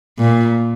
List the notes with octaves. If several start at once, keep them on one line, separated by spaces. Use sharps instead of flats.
A#2